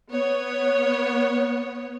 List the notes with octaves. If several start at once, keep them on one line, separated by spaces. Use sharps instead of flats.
B3 C#5